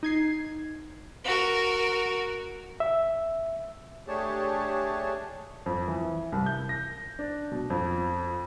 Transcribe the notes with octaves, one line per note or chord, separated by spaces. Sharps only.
D#4 G#6 C7
F#4 A#4
E5
A3 D4 G4 G#4 C#5 A5
F2
E3
C2
G6
A#6
D4
B2
F2